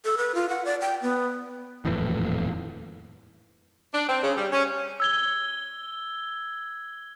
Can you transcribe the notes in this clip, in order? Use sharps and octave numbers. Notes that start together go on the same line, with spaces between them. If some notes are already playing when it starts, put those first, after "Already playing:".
A4
B4
F4
F#5
D5
G5
B3
D#1 F2 A2 E3
D4
C4
C#3
G3
C#4
E6 G#6 G7